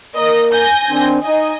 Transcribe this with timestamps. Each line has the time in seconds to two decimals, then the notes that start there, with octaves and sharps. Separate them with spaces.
0.16 A#3 A#4 D#5
0.52 G#5 G6 A#6
0.90 D#3 C4 D4
1.23 D#4 D#5 G#5